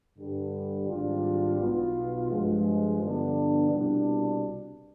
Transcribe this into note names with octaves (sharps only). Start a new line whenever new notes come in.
G2 D3 G3
G#1 G#2 G3 D4 F4
B1 B2 B3 F4
G2 F3 G#3
G2 D3 F3 B3 D4
C2 B2 G3 D4